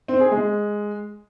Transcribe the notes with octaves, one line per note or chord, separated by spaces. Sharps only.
C4
G#4
G#3